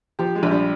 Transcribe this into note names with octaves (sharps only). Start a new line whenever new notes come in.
F3 G4
G#3
A#1
G3